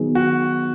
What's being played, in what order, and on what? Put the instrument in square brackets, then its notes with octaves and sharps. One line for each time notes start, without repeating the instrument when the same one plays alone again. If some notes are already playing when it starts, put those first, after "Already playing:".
Already playing: [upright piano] D#3 F#3 B3 D#4 G#4
[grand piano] F#4